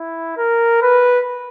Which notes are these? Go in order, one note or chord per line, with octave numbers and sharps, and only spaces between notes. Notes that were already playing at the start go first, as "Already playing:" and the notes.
Already playing: E4
A#4
B4